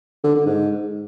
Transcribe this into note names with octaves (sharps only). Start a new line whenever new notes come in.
D3
D3
G#2